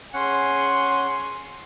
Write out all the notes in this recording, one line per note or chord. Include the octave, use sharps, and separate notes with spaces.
C#4 G#4 F#5 C6